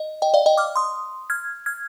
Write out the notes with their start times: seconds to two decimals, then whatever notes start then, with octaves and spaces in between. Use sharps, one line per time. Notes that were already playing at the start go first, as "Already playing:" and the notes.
Already playing: D#5
0.22 D#5 G5
0.34 D5 F5
0.46 D#5 G5
0.58 D6 F6
0.76 C6 D#6
1.30 F6 G#6
1.66 F6 G#6